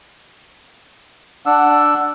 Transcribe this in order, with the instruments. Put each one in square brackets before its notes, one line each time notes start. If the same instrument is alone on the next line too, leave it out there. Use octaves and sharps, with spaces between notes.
[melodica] D4 E6 [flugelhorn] F#5